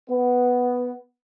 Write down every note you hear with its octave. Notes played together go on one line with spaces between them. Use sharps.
B3